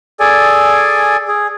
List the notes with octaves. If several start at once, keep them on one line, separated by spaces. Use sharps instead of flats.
G#4 A4 D5 G#5
G#4